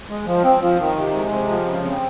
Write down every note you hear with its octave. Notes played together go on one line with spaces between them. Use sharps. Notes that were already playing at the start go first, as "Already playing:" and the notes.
G#3
F3
C4
F3
D#3
C3
G#3
C3
F3
C#3
C4